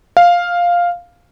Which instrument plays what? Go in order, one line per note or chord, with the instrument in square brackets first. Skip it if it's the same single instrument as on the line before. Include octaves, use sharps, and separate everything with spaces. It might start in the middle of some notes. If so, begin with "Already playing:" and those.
[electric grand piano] F5